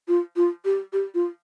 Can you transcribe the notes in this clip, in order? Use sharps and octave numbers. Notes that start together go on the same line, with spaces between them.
F4
F4
G4
G4
F4